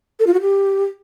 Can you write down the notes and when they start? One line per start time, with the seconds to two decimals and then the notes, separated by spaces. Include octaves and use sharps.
0.20 A4
0.27 F4
0.34 F#4
0.41 G4